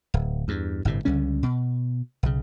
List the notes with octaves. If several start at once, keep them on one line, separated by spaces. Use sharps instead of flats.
D1
E2 G2
G1 A2 C3
C#2 D3 G3 C#4
B2
B1 C#3